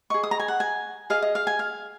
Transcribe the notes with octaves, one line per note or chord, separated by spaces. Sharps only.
G#4 D#5 C#6
D#6
A#5
G#5
F#5
G#5
G#4 D#5 F5
D#5
F5
G#5
F5